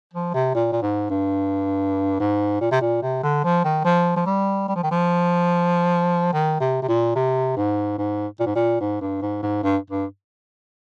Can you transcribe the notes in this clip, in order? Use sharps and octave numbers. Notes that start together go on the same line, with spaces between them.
F3
C3
A#2
A#2
G#2
G2
G#2
A#2
C3
A#2
C3
D3
F3
D#3
F3
F3
G3
G3
F3
D#3
F3
D#3
C3
C3
A#2
C3
G#2
G#2
A#2
G#2
A#2
G#2
G2
G#2
G#2
G2
G2